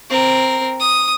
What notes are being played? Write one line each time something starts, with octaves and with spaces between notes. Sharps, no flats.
C4 A#4
D#6